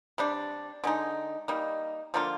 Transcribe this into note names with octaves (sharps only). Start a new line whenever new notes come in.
C3 G3 D4
D3 G#3 D#4
G3 A#3 D#4
D3 F3 A#3 F4